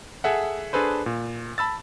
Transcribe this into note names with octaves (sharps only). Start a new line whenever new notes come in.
G#4 A4 E5 F#5
D4 G#4 A4 B4 C5
A#2
A5 B5 E6 A6